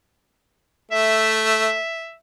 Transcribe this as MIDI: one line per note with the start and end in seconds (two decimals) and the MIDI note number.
0.92 1.75 57
0.92 2.14 76